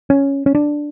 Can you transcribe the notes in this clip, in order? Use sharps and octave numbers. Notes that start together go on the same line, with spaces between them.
C#4
C#4
D4